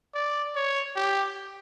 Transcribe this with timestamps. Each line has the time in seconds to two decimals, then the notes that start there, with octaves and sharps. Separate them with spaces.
0.14 D5
0.56 C#5
0.96 G4